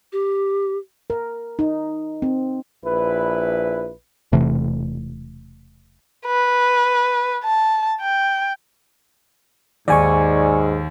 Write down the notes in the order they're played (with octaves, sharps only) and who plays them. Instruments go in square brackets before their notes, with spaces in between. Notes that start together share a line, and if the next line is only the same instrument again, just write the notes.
[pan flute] G4
[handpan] A#4
D#4
C4
[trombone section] A#1 E4 B4
[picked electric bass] E1 C3 E3 A3
[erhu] B4
A5
G5
[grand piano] D#2 [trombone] G#2 [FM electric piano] D5 G#5 C#6